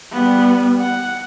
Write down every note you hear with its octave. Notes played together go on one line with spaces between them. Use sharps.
G3 B3
F#5